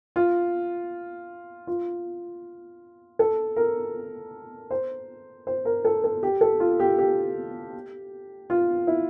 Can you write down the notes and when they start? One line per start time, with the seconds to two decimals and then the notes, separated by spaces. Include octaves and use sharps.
0.16 F4
1.67 F4
3.19 A4
3.56 A#4
4.71 C5
5.47 C5
5.65 A#4
5.85 A4
6.04 A4
6.23 G4
6.41 A4
6.60 F4
6.80 G4
6.99 G4
8.50 F4
8.87 E4